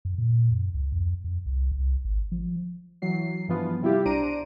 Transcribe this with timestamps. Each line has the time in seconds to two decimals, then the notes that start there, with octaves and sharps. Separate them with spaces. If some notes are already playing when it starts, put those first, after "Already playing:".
0.05 F#2
0.18 A#2
0.52 F#2
0.74 C#2
0.92 F2
1.24 F2
1.46 C2
1.72 C2
2.05 G#1
2.32 F3
3.02 E3 F#3 C7
3.48 G2 E3 F3 B3 F4
3.82 C3 G3 E4 F4 G4
4.05 B1 D4 C5 A#5 D7 D#7